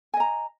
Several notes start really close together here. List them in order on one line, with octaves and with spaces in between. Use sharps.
G#5 D#5 A#5